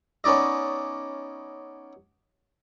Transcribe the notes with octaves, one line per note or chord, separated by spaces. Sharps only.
B3 C#4 D#4 D5 D#5